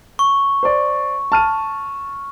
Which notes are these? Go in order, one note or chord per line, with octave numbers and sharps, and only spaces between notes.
C#6
C5 D5
A5 F6 D#7